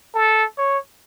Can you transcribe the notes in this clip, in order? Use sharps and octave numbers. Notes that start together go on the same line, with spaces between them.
A4
C#5